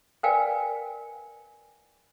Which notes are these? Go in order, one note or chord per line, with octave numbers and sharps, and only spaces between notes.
A#4 B4 D5 F5 G5 G#5